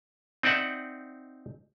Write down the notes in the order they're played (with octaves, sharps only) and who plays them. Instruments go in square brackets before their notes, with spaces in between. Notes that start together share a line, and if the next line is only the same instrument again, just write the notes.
[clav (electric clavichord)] C4 D#4 D5 E5 F#5